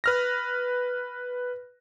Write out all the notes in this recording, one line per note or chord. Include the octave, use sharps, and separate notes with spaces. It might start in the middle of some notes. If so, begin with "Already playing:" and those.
B4 F6 A#6